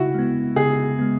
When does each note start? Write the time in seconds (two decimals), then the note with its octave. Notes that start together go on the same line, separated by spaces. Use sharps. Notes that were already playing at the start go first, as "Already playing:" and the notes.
Already playing: C#3 E4 F#4
0.15 G#3 B3
0.56 C#3 G#4
0.99 G#3 B3